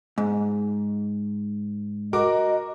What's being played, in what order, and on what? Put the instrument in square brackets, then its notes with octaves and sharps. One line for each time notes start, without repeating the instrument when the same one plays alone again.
[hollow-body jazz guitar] G#2
[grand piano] F#4 A#4 D6 [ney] D#5